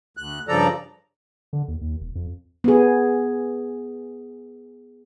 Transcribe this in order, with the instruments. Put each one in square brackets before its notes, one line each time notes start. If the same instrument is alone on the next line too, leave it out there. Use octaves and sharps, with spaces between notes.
[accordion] D2 F#6
G2 C#3 F3 A4 D5 A#5
[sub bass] D3
D#2
D#2
E1
F2
[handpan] B3 G#4